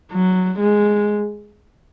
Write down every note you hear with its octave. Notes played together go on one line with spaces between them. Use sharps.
F#3
G#3